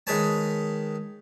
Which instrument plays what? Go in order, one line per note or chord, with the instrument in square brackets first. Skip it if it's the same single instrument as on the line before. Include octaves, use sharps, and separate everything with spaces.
[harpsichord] D#3 G#3 B4 C#5 A5